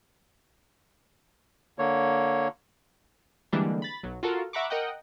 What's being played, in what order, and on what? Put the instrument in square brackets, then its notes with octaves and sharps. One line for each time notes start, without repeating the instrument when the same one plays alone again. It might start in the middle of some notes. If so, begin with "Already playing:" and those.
[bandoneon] D3 A#3 C#5
[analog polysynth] D3 E3 G3 G#3 A#3 D4
B5 A6
B1 F#3
F4 F#4 A4 A#4
E5 F#5 A#5 B5 C#6 D6
A#4 D#5 F#5 G5